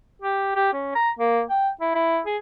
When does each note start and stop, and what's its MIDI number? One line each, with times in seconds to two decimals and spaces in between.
0.22 0.55 67
0.56 0.72 67
0.73 0.94 61
0.95 1.10 82
1.19 1.42 58
1.50 1.69 79
1.81 1.92 64
1.95 2.20 64
2.26 2.37 68